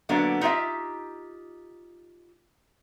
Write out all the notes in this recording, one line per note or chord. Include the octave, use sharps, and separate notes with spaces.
D3 F#3 A#3 B3 D4
D#4 F4 G4 E5